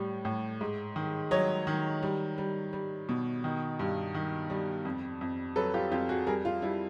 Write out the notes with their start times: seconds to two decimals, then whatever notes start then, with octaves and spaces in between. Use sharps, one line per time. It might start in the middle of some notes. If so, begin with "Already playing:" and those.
Already playing: A2 G3
0.25 A2
0.61 G#2
0.96 D#3
1.31 F#3 C#5 D#5
1.67 D#3
2.03 G3
2.38 G3
2.73 G3
3.09 B2
3.44 D#3
3.79 G2
4.14 D#3
4.50 G3
4.85 F2
5.21 F2
5.56 F#3 A4 B4
5.74 F4 G4
5.91 F2 F4 G4
6.09 F#4 G#4
6.27 G3 G#4 A#4
6.45 F4
6.62 G3 E4